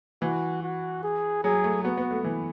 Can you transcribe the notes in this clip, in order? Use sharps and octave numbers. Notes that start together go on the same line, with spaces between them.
E3 F#4
F#4
G#4
F#3 G#4
A3
B3 F#4
B3
A3
E3